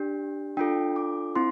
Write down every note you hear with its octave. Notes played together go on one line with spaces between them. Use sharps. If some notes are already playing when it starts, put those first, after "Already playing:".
Already playing: D4 G4
D4 F4 A4 G5
D6
C4 E4 C6